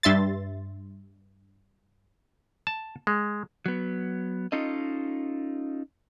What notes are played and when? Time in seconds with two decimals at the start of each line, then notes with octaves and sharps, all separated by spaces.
0.03 G2 E5 C6 A6
2.67 A5
3.07 G#3
3.66 F#3 B3
4.52 C#4 D#4 F4 A4 D#5